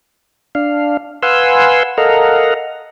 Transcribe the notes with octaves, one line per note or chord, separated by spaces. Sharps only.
D4 F5
B4 F5 F#5 G#5 C6 E6
A4 A#4 D#5 F5 F#5 A#5